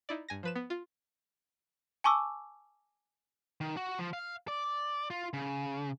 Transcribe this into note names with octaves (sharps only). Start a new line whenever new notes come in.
D#4 E4 D5
G2 G#5 A#6
F3 B4 E7
B3
F4
G#5 A5 C#6 D6 E6
D#3
F#4
F3
F5
D5
F4
C#3